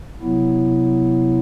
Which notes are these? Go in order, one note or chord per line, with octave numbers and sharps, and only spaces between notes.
C3 F#3 B3 E4